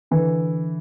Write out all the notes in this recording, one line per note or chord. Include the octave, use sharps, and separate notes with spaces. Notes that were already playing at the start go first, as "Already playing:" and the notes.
D3 E3